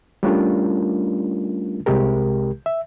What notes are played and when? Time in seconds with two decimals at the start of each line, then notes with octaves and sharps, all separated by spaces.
0.23 G3 A3 C#4 D4 F4 A#4
1.86 C2 C3 G#3 G4 A#4
2.66 E5